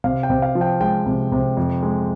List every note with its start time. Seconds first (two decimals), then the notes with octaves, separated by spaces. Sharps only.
0.04 C3 F5
0.23 G5
0.30 C3
0.42 F5
0.55 F3
0.61 G5
0.81 G#3 G5
1.06 C3
1.32 C3
1.57 F2
1.83 G#3